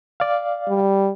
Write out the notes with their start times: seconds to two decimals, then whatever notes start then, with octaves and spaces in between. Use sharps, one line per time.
0.20 D5 F5
0.68 G3